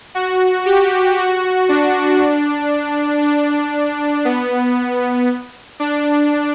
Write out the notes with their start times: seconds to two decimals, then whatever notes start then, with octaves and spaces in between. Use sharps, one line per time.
0.15 F#4
0.66 G4
1.18 F#4
1.69 D4
3.22 D4
4.25 B3
5.80 D4